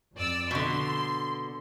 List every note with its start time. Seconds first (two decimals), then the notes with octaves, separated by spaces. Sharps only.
0.16 F2 D5 E6
0.51 B2 D3 C6